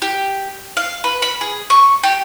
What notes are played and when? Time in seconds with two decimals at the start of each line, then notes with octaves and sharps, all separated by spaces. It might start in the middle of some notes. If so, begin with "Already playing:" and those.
0.02 G4
0.77 F5
1.04 B4
1.22 B5
1.41 G#4
1.70 C#6
2.03 G4